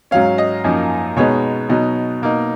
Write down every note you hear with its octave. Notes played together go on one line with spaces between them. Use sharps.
G#2 F#3 C#4 F5
D#5
F#2 F3 A#3 D#4
B2 G#3 B3 D#4 C#5
B2 F#3 B3 D#4
B2 A#3 D#4